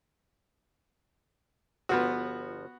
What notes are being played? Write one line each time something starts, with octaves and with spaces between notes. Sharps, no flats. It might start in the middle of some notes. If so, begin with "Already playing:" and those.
G1 F3 B3 F#4